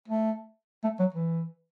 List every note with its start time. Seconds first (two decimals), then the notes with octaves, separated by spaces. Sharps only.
0.08 A3
0.84 A3
0.99 F#3
1.14 E3